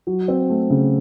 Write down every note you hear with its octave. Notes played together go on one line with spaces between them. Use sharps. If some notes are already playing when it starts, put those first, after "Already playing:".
F#3
C4
A3
C#3